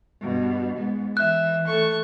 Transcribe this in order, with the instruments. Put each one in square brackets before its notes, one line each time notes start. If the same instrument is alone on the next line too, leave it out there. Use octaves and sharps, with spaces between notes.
[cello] G2 B2
G#2 B3
[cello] E3 [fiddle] E5 [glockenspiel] F#6
[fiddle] A3 C#6